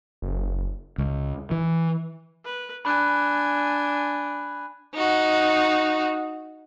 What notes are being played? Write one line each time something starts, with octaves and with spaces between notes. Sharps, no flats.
F#1
C#2
E3
B4
D4 G#5 B5 F#6
D#4 F#4